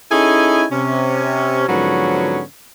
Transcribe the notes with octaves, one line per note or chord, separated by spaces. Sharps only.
C#4 D#4 E4 G#4 A4 G#5
C3 C#4
G#2 D3 F3 F#3 B3 C#4